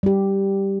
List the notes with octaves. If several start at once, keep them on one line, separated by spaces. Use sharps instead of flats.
G3 G4